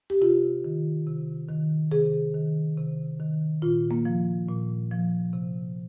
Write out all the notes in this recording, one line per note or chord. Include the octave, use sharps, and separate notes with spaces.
G4
C3 F4
D#3
C3
D#3
C3 G#4
D#3
C3
D#3
A#2 F4
A#3
F3
A#2
F3
C3